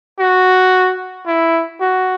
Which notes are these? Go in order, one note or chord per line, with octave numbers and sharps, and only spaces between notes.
F#4
E4
F#4